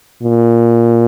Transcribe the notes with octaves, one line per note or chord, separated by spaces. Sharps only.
A#2